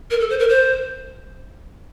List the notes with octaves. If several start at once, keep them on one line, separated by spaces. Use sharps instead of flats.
A#4
A4
C5
A#4
C5